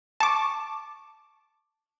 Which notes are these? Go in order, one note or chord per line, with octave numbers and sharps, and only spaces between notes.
A5 C#6 D6